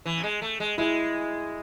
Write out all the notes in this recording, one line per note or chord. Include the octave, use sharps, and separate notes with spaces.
E3
G#3
A3
G#3
G#3 E4